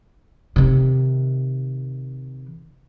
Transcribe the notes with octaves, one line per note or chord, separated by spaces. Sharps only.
C3 D#3